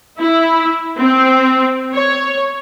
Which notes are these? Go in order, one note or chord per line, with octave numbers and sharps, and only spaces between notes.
E4
C4
C#5